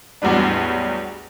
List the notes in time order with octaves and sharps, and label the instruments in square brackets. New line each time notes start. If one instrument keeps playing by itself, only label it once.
[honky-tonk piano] A1 E2 F#3 G3 D4